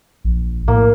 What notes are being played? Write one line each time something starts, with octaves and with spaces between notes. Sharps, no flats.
A#1
A2 A#3